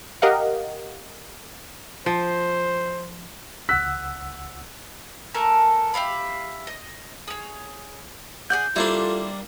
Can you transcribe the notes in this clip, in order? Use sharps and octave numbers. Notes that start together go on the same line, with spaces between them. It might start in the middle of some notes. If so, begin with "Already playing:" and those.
G4 A#4 D#5 F5 F#5
F3 C5
C#2 F#5 E6 F#6 B6
A3 A4 A#4 G#5
G4 E5 F5 B5
D#5
G#4 C#5
G#4 D5 F#5 G6
G3 A#3 D4 E4 F4 A4 C5 C6